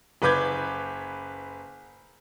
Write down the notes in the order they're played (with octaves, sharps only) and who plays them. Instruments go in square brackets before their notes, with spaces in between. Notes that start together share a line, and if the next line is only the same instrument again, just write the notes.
[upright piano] F#1 B4 B5 D6 G6 G#6